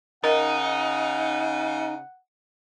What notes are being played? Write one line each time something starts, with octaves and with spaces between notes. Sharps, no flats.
C#3 D#4 A#4 D#5 F#5